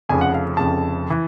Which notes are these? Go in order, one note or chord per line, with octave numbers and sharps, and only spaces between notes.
F1 F2 C#3 F3 G#5
F#5
F5
F1 F2 C#3 F3 A5
E3